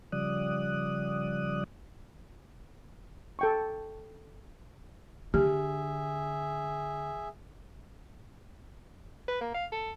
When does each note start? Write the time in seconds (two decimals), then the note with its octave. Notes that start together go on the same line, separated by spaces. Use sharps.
0.12 C#3 F3 G3 D5 D#6 F#6
3.39 A4 G5 C#6
5.34 D3 G4 G#4 E5
9.28 B4
9.41 A#3
9.54 F5
9.72 A4